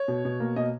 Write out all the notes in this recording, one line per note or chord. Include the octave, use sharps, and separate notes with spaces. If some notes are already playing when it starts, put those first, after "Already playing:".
Already playing: C#5
B2
B2
A#3
B2 D#5